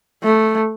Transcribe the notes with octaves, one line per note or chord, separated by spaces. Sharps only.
A3